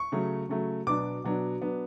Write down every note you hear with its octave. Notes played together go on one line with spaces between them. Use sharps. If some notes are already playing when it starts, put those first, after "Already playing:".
Already playing: C#6
C#3 F#3 A3
C#3 F#3 A3
B2 F#3 B3 D4 D6
B2 F#3 B3 D4
F#3 B3 D4